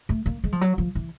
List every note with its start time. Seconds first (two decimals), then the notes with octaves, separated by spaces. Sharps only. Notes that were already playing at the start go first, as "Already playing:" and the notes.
0.09 A3
0.26 A#3
0.44 G#3
0.52 F3
0.61 F#3
0.78 F3
0.95 E3